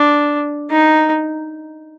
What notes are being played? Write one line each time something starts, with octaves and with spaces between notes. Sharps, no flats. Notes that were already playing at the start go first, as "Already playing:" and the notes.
Already playing: D4
D#4